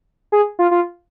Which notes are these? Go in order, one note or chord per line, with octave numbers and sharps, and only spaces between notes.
G#4
F4
F4